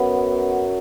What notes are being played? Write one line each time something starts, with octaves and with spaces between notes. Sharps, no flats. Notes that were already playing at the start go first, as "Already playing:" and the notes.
Already playing: F#2 F#3 B3